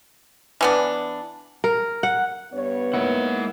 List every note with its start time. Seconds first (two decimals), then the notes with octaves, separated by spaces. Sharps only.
0.61 E3 B3 D4
1.64 A#4
2.03 F#5
2.54 G2 B3 B4 C#5
2.94 G#3 A#3 D#4 E4 F#5